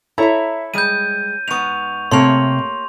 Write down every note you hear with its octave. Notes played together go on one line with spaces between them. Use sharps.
E4 A4 C#5 E5 A#5
G3 G#3 G6 D#7
G#2 B3 C#6 F7
C3 A3 A#3 C#5 C6 F7